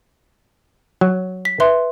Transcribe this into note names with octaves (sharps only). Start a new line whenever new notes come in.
F#3
B6
B4 E5 C6